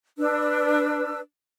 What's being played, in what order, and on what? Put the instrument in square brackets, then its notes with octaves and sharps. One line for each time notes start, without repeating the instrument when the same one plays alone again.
[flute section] D4 B4 E6